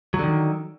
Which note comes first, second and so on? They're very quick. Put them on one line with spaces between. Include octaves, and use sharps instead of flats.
F#3 D3 D#3